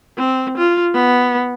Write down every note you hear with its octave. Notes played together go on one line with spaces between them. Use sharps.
C4
F4
B3